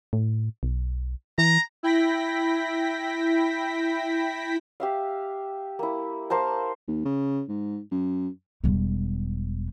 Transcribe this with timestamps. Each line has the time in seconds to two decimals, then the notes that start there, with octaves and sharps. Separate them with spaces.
0.13 A2
0.63 B1
1.38 E3 A#5
1.83 E4 G5 B5 A#6 B6
4.80 G4 E5 F5
5.79 A#3 E4
6.30 A#3 A#4 C5 A5
6.88 D#2
7.05 C#3
7.48 G#2
7.91 F#2
8.64 E1 G3